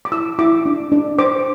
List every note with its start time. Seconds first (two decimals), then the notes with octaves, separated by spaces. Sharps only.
0.05 D6
0.12 E4 E6
0.39 E4 D6
0.66 D4
0.92 D4
1.18 C5 D6